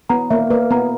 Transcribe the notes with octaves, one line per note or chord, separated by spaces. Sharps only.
B3 A#5
A#3 E5
A#3 B4
B3 A#5